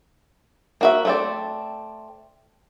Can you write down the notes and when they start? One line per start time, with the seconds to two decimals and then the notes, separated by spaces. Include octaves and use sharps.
0.81 A#3 F#4 E5
1.05 A3 C4 D5